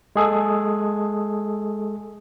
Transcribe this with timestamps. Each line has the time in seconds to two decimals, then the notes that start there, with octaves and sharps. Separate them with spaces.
0.16 G#3 G#4 A4